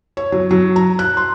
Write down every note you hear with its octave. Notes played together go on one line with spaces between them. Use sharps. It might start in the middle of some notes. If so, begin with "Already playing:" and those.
C#5
F#3
F#3
A#5
F#6
C6